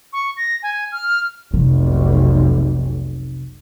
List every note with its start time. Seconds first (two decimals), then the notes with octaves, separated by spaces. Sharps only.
0.13 C#6
0.37 A#6
0.63 G#5
0.92 F6
1.54 F1 B1 C3